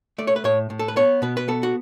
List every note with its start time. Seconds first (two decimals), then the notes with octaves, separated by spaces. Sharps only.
0.18 A3 D5
0.27 C#5
0.36 B4
0.44 A2 C#5
0.70 A2
0.79 A4
0.88 B4
0.96 B3 C#5
1.22 B2 B4
1.37 B4
1.48 B3 A4
1.63 F#4